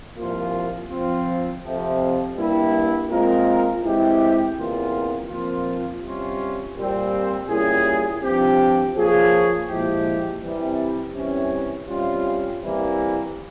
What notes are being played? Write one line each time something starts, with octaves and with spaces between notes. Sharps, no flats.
C2 A#2 F3 A#3 F4
F3 C4 F4
F2 C3 F3
G2 G3 A#3 E4
A#2 G#3 C4 F4 A#4
E3 G#3 C4 E4 G4
E2 C3 E3 A#3 F4
A#2 F3 C4 F4
C3 G3 C#4 F4
A#2 G3 C4
A#2 G3 C#4 E4 G#4
G2 F3 C4 G4
F3 A#3 F4 G#4 C#5
A#2 F3 G#3 E4 G4
C3 E3 G3
C3 E3 G3 C#4
C3 G3 C#4 F4
C3 E3 G3 A#3 E4